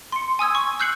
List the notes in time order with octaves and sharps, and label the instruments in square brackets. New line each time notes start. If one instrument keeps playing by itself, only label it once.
[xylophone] C6 C#7
G#5 D#6 E6 G#6
C#6
E6 F#6 G6 C7 C#7 F#7